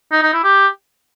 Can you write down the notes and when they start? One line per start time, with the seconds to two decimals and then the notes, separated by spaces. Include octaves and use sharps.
0.12 D#4
0.23 D#4
0.33 E4
0.44 G4